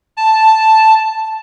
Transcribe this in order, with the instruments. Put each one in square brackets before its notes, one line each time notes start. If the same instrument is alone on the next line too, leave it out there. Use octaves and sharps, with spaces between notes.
[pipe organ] A5